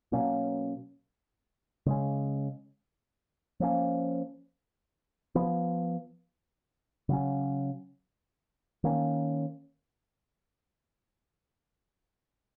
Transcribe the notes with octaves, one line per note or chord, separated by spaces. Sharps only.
B2 F#3 A#3 C#4
C#3 G#3 C#4
F3 A#3 C#4
F3 B3
C#3 F#3 C#4
D#3 A#3 C#4